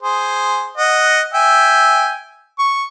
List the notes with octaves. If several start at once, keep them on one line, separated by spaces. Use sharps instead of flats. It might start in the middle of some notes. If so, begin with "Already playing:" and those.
G#4 C5
D#5 F#5
E5 G5 G#5
C#6